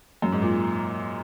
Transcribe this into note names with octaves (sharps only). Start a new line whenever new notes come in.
F#2
G#2
A#2